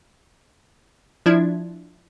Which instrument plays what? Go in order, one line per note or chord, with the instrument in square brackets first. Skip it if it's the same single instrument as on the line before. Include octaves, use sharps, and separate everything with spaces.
[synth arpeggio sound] F3 D4 E4 G#6